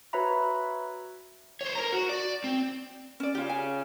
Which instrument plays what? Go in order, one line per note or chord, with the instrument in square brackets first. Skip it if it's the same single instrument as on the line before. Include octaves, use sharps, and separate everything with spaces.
[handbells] F#4 B4 C#5 E5 A#5 B5
[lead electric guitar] C5 C#5
A#4 A#5
F#4
D5
C4
[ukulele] C#4 D5
[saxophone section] C#3 [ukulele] F4 G4
[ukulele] G#5